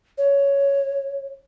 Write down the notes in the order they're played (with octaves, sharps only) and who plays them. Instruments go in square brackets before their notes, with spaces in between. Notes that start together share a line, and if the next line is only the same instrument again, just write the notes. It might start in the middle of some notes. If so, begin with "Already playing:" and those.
[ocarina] C#5